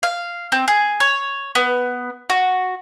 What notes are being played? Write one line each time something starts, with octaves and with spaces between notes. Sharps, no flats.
F5
C4
G#4
C#5
B3
F#4